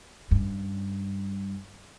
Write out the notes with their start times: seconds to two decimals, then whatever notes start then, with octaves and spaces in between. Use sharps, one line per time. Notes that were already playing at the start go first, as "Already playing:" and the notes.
0.31 G2 C#4